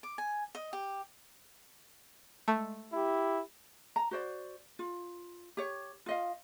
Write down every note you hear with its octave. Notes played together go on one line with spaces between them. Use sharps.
D6
G#5
D#5
G4
G#3 A3
E4 G4
A#5
F#4 C5 D5
F4
G4 C#5
F4 D#5 F5